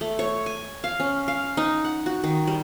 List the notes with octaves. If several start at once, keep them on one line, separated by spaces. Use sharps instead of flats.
A3
C#5
G#5
F5
C#4
F5
D#4
F#5
F#4
D#3
G3